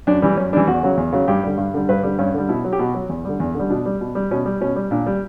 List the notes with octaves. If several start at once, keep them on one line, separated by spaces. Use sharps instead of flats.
F#2 D4
E3 G3
F#2 C#4
E3 G3 D4
E2 F#4
C#3 F#3
E2
C#3 F#3
G2 G4
D3 G3
G2
D3 G3
G2 B4
D3 G3
G2 C#4
D3 G3
B2 E4
F#3
G4
B2 F#4
F#3
E2
D3 G3
E2
D3
G3
B2 D4
G3
B2
G3
B2 C#4
G3
B2 C#4
G3
A#2 D4
G3